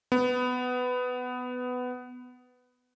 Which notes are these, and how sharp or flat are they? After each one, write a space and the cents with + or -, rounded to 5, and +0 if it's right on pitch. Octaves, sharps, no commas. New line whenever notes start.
B3 +15